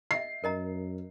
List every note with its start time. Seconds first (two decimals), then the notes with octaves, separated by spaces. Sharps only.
0.11 D#5 E5 C7
0.44 F#2 A#4 D#5 A#5